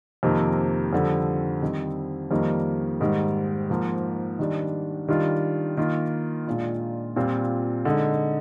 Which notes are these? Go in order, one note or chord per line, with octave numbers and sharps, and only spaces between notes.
F2 C3 D#3 A#3
F2 D3 G3
D#3 G3 C4
F2 D#3 G3 A#3
G#2 D#3 G3
G#2 F3 A#3
D#3 G3 D4
D#3 G3 D4 F4
D#3 A#3 F4
A#2 G#3 D4 F4
A#2 G3 C4 F4
D3 G#3 D#4